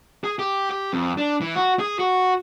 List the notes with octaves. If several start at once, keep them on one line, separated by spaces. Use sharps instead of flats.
G#4
G4
G4
F2
D4
E3
F#4
G#4
F#4